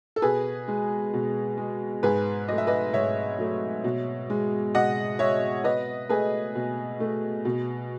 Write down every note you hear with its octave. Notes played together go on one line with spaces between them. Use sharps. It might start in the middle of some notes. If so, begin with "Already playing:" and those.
A4
B2 G#4 B4
G#3
B2
G#3
G#2 G#4 B4
F#3 A3 D#5
E5
B4 D#5
G#2 C#5 E5
F#3 A3
B2
G#3
B2 D#5 F#5
G#3 C#5 E5
B2 B4 D#5
A3 G#4 B4
B2
A3
B2